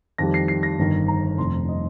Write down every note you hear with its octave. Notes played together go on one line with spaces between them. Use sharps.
F2 D#3 G3 A#6
C7
C7
A#6
G1 G2 D#3
A#5
F1 F2 C3 C6
D#5